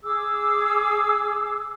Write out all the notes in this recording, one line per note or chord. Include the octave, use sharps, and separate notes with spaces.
G#4 D6 E6